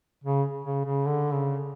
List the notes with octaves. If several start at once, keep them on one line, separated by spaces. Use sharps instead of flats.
C#3
C#3
C#3
D3
C#3